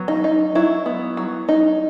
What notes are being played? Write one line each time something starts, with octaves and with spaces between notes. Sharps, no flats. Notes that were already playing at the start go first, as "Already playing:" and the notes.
Already playing: F#3 B3
D#4
D#4
F#3 E4
B3
F#3
D#4